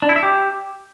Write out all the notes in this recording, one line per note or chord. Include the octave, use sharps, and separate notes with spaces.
D4
E4
E5
G4